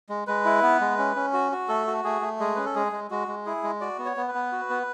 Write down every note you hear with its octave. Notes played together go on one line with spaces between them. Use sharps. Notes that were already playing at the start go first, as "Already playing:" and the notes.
G#3
G#3 B4
E4
B3
G#3
C#4
C#4
F#4
F#4
A3 A4
F#4
A3 G#4
A3
G#3 G#4
C#4 B4
A4
G#3 G#4
G#3
G#3 F#4
G#3
E4 G#4
G#3
F#4 D5
B3
C#5
B3
B4
B3
F#4
B3